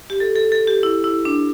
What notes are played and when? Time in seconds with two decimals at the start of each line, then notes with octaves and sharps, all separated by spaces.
0.10 G4
0.20 A4
0.35 A4
0.52 A4
0.67 G4
0.83 E4
1.04 E4
1.25 D4